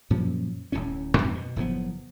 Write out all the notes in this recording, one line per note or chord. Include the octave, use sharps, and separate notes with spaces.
F#2 A#2 F3 C#4
D1 G1 A2 C#4
F2 G#2 C4
B2
F#1 A2 F3 B3